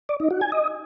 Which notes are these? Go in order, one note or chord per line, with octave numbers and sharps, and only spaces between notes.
D5
D#4
F#4
G#5
D#5